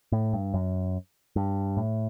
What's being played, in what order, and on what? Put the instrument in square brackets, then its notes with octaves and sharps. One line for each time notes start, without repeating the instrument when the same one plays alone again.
[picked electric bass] A2
G2
F#2
G2
A2